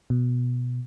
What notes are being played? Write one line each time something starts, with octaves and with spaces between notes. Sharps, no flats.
B2